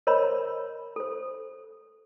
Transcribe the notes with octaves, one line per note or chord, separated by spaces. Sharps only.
A#4 C5 C#5 D#5 B5
A4 C5